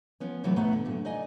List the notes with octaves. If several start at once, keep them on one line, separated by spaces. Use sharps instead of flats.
F3 B3 C#4
C3 E3 F#3 A3 B3 C4
D2 B2 A3 B3 F#5 A#5
D3
F#2 A#2 D3
D#4 D5 D#5 G#5